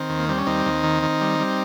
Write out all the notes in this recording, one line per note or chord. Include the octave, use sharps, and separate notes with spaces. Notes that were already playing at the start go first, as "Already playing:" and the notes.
Already playing: D#3 C4
D#2
A#3
G3 C4
C#4
D#2 C4 D#4
D#2
D#3
D#3
G3
G3